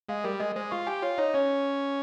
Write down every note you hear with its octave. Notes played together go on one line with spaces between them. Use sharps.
G#3 F5
G3 A#4
G#3 D#5
G#3 C5
F4 C#6
G4 G#5
F4 C#5
D#4 C#5
C#4 C#5